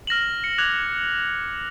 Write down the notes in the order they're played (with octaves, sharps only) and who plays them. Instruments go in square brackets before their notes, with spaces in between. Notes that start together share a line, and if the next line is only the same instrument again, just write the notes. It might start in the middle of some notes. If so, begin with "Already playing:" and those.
[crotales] F6 A#6 E7 F#7
C#7
D6 F#6 G#6 F7 F#7